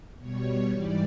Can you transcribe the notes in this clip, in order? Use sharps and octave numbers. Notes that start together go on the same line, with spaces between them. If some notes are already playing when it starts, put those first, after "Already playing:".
B2 G3 C#5
G#2 E3 G3 D5